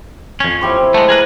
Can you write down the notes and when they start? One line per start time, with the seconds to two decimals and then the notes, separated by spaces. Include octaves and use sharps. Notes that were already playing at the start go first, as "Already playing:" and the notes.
0.40 F2 C#4
0.61 E4 G4 C5
0.94 G#3 A3
1.09 G#4 A#4 B4